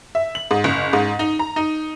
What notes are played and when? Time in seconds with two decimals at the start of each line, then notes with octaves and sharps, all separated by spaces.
0.15 E5
0.35 F#7
0.51 G#2
0.64 F#1
0.93 G#2
1.19 D#4
1.39 A#5
1.56 D#4